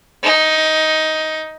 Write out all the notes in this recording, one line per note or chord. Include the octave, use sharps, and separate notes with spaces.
D#4